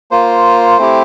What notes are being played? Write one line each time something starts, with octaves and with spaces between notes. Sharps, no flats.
A#3 F4 C5
A3 C4 E4 G4